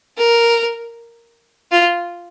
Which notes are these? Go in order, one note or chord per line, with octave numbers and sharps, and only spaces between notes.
A#4
F4